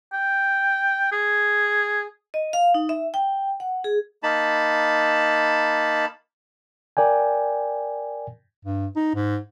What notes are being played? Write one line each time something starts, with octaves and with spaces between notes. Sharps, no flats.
G5
G#4
D#5
F5
D#4
E5
G5
F#5
G#4
A#3 D#4 A5 B5
A#4 D5 G5 G#5
G2
D#4
G#2